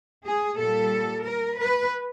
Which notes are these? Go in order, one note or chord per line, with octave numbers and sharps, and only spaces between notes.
G#4
A#2 G3 A4
A#4
B4